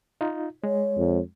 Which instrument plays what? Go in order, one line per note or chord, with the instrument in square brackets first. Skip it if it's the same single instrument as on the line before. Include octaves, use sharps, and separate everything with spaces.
[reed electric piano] D#4 F4
[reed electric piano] G#3 [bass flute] C#5
[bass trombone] F2